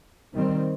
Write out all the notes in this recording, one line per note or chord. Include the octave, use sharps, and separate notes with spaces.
D#3 G3 C4